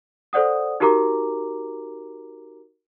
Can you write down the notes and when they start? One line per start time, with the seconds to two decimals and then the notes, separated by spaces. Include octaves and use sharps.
0.33 A4 C5 D5 F#5 D#6
0.80 D#4 F#4 G4 A#4 A#5 D6